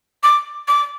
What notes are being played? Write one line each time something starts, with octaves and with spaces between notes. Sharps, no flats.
D6
D6